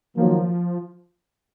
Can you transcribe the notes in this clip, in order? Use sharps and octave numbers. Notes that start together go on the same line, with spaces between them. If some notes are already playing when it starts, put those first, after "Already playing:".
D#3 F3 F#3 A#3